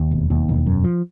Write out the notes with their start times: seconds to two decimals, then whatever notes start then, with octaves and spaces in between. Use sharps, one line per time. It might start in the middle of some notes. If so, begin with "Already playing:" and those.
Already playing: D#2
0.11 E1
0.30 D#2
0.49 E1
0.66 F#2
0.84 F3